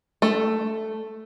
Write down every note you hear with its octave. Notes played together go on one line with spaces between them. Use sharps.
A3